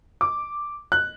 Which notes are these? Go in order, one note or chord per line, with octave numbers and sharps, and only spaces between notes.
D6
F#6